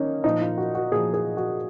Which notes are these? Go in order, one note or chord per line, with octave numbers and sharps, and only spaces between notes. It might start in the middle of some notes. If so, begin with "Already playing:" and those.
Already playing: D#3 A#3 C#4 D#4
A#2 F3 D#4
F4
F#4
F#4
A#2 F3 G#4
G#4
F#4